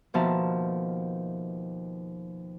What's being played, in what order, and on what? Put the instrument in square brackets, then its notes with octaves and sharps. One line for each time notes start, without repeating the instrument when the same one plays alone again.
[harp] D#2 B2 F3 E5 A5 A#5